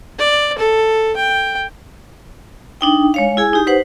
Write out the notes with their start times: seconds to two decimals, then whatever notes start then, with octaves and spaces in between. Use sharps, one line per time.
0.18 D5
0.58 A4
1.16 G5
2.81 D4 D#4 G5
3.14 G#3 C#5 F5
3.37 E4 G#4 G#5
3.53 D#4 G4
3.67 B4 C5 F#5